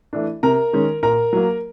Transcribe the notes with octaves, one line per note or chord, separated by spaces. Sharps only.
E3 A3 D4
C3 A#4 A#5
D#3 G#3 C#4
A#2 A#4 A#5
F#3 A#3